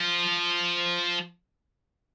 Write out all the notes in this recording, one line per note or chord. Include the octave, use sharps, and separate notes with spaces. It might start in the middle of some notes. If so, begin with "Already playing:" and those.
Already playing: F3